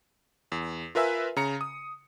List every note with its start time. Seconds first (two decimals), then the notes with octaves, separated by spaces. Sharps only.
0.52 E2
0.95 F4 A#4 B4 E5 G#5 E6
1.36 C#3 A#5 C#7
1.61 D#6